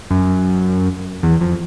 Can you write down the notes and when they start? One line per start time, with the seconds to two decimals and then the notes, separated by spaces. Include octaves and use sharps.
0.10 F#2
1.23 E2
1.41 F2